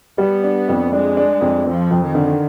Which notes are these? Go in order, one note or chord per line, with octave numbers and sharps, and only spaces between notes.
G3 B3
D4
F2
G#3 D4
D4
F2
F3 C4
F2
D#3
D3